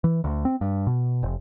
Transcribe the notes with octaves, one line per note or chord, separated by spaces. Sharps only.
E3
D2
C4
G2
B2
F1